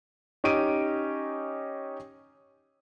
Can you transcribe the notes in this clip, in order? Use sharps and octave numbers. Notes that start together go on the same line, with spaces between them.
C#4 D#4 G4 D7 D#7